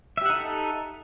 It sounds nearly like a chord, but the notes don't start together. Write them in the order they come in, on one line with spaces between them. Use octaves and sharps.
E5 G4 F#5 D#4 A4